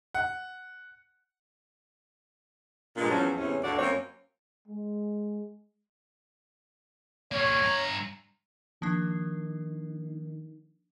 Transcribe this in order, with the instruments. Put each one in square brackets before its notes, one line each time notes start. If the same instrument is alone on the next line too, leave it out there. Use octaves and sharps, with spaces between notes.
[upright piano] F#5
[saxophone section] G2 A#2 G#3 A#3 D4
E2 F3 F#3 C#4
E2 A2 C3 C#4 C#5
D2 G2 D3 F#4 D5
F#2 F#3 A#3 C4 C#5
[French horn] G#3
[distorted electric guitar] G3 A#3 [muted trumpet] C#5
[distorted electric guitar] G2 A#5
[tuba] D#3 [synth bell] F3 A#3 D4